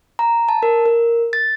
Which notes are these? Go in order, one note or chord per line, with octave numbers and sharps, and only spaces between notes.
A#5
A5
A#4
A#4
A6